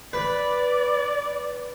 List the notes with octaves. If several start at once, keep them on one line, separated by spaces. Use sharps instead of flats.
B4 D5